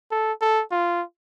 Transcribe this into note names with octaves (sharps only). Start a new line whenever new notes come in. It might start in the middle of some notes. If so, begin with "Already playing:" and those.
A4
A4
F4